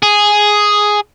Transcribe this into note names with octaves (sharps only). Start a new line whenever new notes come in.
G#4